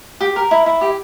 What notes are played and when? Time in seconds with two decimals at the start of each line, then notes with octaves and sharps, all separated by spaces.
0.21 G4
0.36 A#4
0.51 E4
0.66 E4
0.81 G4